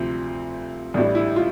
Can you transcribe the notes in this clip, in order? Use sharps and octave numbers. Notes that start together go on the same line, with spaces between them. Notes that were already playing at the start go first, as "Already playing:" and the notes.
Already playing: D2 C3 F3 C4
A1 A2 G3 D4
E4
F4